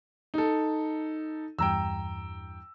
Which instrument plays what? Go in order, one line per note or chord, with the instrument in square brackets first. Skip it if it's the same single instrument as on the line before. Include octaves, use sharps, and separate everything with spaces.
[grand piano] D#4 A4
[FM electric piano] E2 G2 [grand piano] G5 A#5 E6